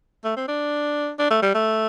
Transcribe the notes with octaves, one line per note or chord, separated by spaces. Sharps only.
A3
C4
D4
D4
A3
G3
A3